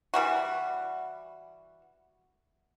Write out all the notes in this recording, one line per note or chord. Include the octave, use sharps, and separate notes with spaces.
E3 G3 F#4